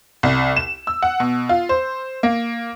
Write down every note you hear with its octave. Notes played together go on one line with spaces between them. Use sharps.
C2
E7
E6
F#5
B2
F4
C5
A#3